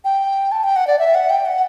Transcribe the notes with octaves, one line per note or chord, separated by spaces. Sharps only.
G5
A5
G5
F#5
D5
E5
F#5
G5
F#5